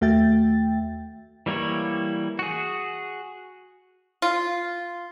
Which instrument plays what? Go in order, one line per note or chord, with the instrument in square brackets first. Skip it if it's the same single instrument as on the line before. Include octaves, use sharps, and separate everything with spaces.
[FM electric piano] D#2 A3 F#4 E5 G5 A6
[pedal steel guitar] E3 G3 A#3 E4 C#5
F#4 G#4
[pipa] F4